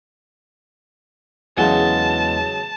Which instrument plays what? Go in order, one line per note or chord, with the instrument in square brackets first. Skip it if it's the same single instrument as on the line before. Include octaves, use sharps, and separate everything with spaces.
[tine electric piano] E2 E3 G#3 [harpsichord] C#3 F#3 [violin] A5